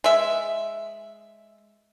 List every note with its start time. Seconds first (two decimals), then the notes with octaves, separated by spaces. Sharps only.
0.04 G#3 E5